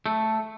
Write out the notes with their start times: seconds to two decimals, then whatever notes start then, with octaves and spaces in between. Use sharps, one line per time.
0.06 A3